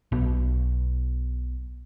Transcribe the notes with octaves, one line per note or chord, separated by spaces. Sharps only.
B1 B2